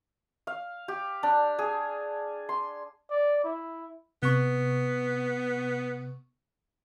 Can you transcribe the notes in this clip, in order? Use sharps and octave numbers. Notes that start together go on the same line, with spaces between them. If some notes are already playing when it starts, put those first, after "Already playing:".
F5
G4
D4
G#4
C6
D5
E4
C3 B3 C#6